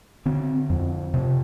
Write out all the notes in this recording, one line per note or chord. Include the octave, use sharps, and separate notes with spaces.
D3 C4
F2
C3